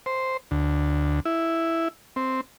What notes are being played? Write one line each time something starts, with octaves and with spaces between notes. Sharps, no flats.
C5
D2
E4
C4